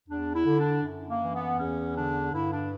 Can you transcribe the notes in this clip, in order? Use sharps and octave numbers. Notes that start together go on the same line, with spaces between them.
E2 D4
E4
D3
D4
F#2
A#3
E3
B3
E2 C#4
D3 D4
G2 E4
D4